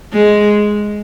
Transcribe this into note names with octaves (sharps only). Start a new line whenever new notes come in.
G#3